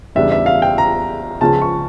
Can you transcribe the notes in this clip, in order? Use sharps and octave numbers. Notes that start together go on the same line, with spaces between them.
E2 C#3 G3 D4 E5
E5
F5
G5
A#5
C#2 C#3 F3 C#4 A5
C#6